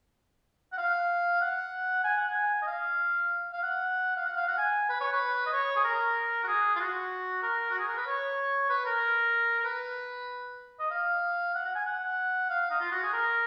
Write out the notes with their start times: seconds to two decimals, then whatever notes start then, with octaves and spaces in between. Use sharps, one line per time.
0.73 F#5
0.78 F5
1.41 F#5
2.04 G#5
2.17 F#5
2.30 G#5
2.62 D#5
2.67 F5
3.52 F5
3.63 F#5
4.16 F5
4.26 F#5
4.37 F5
4.48 F#5
4.58 G#5
4.89 B4
5.01 C#5
5.12 B4
5.46 D#5
5.52 C#5
5.76 G#4
5.84 A#4
6.44 F#4
6.48 G#4
6.75 F4
6.80 F#4
7.43 A#4
7.70 F#4
7.79 G#4
7.88 A#4
7.97 B4
8.07 C#5
8.69 B4
8.85 A#4
9.60 A#4
9.64 B4
10.79 D#5
10.91 F5
11.55 F#5
11.65 F#5
11.75 G#5
11.86 F#5
12.50 F5
12.70 D#4
12.80 F4
12.92 F#4
13.03 G#4
13.13 A#4